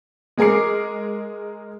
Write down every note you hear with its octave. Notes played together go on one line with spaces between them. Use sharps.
G#3 G#4 A#4 D6 C7